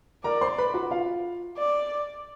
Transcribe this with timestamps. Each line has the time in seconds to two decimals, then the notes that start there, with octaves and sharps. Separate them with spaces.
0.24 A#4 D5 A#5
0.41 C5 C6
0.58 B4 B5
0.74 F#4 F#5
0.91 F4 F5
1.58 D5